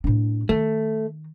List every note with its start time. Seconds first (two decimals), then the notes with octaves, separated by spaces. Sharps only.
0.04 A2 D4
0.49 D#3 A3